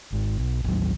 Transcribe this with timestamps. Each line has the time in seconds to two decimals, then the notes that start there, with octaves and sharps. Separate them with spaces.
0.12 G#1
0.38 B1
0.64 A1 D#2 F#3